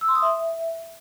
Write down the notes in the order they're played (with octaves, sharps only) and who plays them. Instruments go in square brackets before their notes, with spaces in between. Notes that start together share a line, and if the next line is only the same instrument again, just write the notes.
[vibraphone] E6
C6
D#6
E5